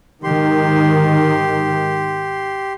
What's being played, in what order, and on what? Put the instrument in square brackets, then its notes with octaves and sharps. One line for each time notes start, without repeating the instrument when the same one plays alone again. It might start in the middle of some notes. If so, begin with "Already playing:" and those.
[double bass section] G#2 D#3 [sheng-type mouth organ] G4 C6